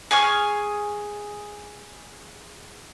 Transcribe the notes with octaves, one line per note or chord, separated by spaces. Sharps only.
G#4 G#5 C#6 F6